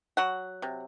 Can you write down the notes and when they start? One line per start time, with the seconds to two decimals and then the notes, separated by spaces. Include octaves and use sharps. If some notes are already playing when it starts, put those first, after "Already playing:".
0.17 F#3 F#5
0.62 C3